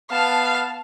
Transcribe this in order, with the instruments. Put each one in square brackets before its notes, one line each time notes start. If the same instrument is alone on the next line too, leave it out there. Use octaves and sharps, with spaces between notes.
[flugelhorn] B3 [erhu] F5 [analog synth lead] A5